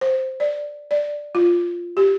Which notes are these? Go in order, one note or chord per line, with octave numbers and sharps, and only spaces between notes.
C5
D5
D5
F4
G4